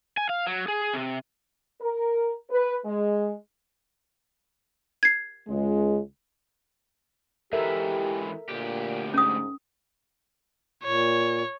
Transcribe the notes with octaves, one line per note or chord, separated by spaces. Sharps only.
G#5
F5
F#3
G#4
C3
A#4
B4
G#3
G#6 C7
C#2 G#3
G#2 E3 G4 A4 A#4 E5
D2 A#2 G4
G#2 C#4 D#6
A#2 C#5